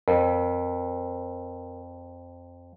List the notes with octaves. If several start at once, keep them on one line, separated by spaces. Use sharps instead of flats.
F2 A#4